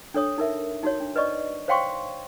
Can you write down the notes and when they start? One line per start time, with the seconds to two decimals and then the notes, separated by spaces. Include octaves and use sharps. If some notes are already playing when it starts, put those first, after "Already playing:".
0.14 D4 A4 C#5 D#6
0.38 D#4 A#4 E5
0.83 D#4 F#4 C#5
1.00 D4
1.16 B4 D5 D#5 C#6
1.68 C5 C#5 F5 G5 C6 C#6